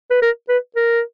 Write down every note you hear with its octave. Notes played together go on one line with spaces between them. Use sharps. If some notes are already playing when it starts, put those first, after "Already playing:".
B4
A#4
B4
A#4